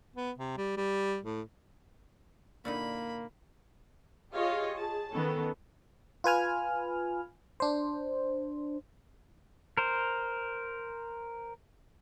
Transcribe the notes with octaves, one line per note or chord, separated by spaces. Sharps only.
B3
C3
G3
G3
A2
A#2 D3 A#3 D#4 B5
F4 G4 G#4 C#5 D#5 F5
G#4 A5
D#3 B3 C#4 A4
F4 B4 G#5 F6
D4 C5
A#4 C5